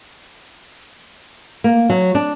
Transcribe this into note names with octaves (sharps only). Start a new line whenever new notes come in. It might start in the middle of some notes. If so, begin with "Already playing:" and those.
A#3
F#3
D4